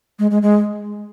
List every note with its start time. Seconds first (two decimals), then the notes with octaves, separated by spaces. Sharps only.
0.19 G#3
0.31 G#3
0.42 G#3